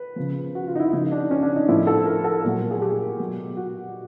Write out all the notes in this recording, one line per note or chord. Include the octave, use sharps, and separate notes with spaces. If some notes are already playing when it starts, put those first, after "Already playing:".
Already playing: B4
C#3 F3
F#4
F4
D#4
E4
C#3 F3 D#4
D4
C#4
D4
D#4
A2 F3 E4
A4
A#4
A4
A#2 F#3
G#4
G4
B2 F#3
F#4